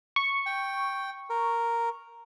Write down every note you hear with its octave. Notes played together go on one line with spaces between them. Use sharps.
C#6
G5
A#4